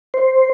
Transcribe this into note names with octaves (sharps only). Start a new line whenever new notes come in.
C5